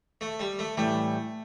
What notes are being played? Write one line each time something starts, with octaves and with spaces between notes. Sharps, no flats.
A3
G3
A3
A2 E3 G3 A3